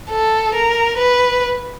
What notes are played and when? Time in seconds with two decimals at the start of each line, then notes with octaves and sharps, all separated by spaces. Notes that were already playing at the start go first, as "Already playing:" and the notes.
0.11 A4
0.55 A#4
0.98 B4